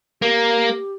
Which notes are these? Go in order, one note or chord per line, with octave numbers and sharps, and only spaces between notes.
A#3 G4